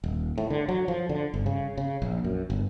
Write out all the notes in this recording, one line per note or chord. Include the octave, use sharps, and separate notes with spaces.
D#1
A2
D3
F#3
F3
D3
G1
C#3
C#3
A#1
F#2
G1